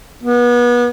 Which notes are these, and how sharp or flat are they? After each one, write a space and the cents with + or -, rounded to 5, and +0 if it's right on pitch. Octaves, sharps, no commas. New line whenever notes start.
B3 -30